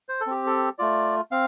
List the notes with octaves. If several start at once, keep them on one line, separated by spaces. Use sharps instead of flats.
C5
A4
C4 G4
A4
A3 F4 D5
C4 F5